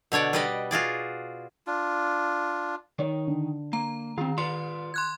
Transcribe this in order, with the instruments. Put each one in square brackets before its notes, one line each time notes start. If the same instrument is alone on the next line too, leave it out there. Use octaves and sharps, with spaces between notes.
[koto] B2 D3 C#5 D5 F#5
G3 B3 B4 D5 D#5
F4 F#4 G#4 D5
[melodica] D4 F4
[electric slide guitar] D#3 D#4 [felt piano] C#5
[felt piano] D3
[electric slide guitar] A#3 [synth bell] A#5
[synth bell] D#3 [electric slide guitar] C4 F4
[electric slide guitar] F4 B4 D5 [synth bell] C6 [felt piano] C#7
[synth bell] C6 F#6 G#6